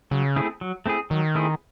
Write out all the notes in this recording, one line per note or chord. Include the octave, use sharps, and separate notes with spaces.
C#3 F#3
A3 C4 E4 G#4
F#3
A3 C4 E4 G#4
D#3 F#3
A3 C4 E4 G#4